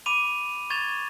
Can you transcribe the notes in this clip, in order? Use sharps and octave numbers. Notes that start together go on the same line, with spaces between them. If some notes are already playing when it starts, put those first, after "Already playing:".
B5 D6 D#7 F7
C#6 G#6 A6 E7 F7